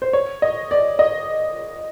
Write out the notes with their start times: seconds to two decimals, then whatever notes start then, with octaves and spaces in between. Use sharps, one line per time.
0.02 C5
0.13 C#5
0.42 D#5
0.71 D5
0.99 D#5